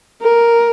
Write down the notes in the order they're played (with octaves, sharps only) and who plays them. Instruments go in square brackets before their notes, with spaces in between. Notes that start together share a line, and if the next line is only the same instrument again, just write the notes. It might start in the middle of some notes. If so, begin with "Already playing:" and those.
[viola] A#4